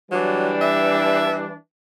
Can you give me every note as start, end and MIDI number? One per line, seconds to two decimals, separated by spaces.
0.12 1.53 52
0.12 0.53 54
0.12 1.53 55
0.12 1.53 62
0.61 1.36 76